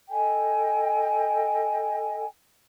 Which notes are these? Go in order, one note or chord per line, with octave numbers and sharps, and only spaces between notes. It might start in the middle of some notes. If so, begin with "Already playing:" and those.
A4 D#5 G5 G#5